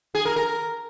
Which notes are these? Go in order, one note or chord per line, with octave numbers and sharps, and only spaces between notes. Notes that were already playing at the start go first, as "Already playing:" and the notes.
G#4
A#4
A#4